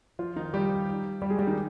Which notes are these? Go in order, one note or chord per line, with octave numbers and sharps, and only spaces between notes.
F3 F4
D#3 D#4
G3 G4
G3 G4
G#3 G#4
G3 G4
D#3 D#4